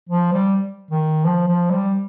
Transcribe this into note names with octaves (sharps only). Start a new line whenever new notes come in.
F3
G3
D#3
F3
F3
G3